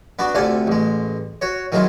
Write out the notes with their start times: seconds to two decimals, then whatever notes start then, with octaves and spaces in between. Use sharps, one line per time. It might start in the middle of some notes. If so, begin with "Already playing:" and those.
0.19 B3 D4 F#4
0.35 D2 C3 F4 A4 D5 G#5
0.67 A1 G#3
1.41 F#4 C#5
1.72 D#3 F#3 G#3 E4 F4